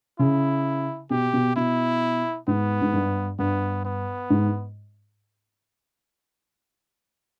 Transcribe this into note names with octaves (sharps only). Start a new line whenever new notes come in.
C#3 E4
B2 G4
B2
B2 E4
G#2 B3
G#2
G2
G2 B3
B3
G#2